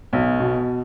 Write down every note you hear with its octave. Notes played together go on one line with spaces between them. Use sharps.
B1
B2